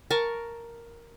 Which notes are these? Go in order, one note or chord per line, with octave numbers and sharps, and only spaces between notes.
A#4 A5 C#6